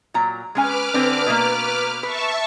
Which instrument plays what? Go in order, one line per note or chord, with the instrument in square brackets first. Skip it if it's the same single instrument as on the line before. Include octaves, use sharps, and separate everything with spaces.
[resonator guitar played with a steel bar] A#2 F#3 A#5
[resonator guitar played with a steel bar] G#3 C#4 G#5 [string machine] B4 D6 F6
[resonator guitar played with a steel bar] D3 C4 D4
B2 A#3
[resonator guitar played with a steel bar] B4 [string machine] E5 A5 C#6